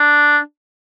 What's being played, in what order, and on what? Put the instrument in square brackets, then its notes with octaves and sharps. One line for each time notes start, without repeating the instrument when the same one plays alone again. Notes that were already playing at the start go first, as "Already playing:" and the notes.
Already playing: [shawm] D4